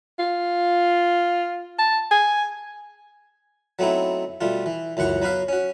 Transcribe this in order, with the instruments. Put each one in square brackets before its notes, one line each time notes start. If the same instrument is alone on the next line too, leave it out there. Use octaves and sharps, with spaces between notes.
[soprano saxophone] F4
A5
G#5
[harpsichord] F#3 A3 B3 C4 D#4 E4
B2 G3 A3 F4
E3
C#2 F#2 E3 F#5 C#6
F#3 B3 F#4 B4 F5
C#4 F#4